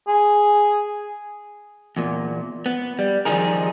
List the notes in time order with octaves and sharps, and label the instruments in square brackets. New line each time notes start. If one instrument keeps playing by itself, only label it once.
[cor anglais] G#4
[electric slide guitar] E2 A#2
B3
G3
D#3 F3 G3 D#4 G#4 A#4